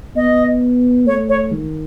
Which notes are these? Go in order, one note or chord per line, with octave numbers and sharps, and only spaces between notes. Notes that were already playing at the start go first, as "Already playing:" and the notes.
B3 D#5
A3 C#5
C#5
D#3